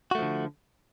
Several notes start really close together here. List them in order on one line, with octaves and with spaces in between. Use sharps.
F#4 A3 F3 D3